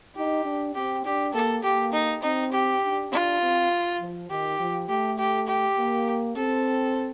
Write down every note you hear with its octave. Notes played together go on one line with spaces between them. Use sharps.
D#4 G4
D4
C4 G4
D4 G4
A#3 A4
A#3 G4
D#4
C4 D#4
G4
D4
D4 F4
C4
F3
D#3 G4
F3
A3 G4
G4
G4
A#3
C4 A4